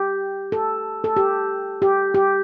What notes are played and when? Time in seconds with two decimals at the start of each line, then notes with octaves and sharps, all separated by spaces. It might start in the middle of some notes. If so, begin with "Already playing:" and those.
Already playing: G4
0.52 A4
1.04 A4
1.17 G4
1.82 G4
2.15 G4